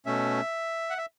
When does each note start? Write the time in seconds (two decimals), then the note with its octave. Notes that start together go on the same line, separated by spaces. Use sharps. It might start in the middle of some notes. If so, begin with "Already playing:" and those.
0.06 B2 A3 C#4 E5
0.90 F#5
0.98 E5